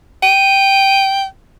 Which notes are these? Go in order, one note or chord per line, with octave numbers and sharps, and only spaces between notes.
G5 D#7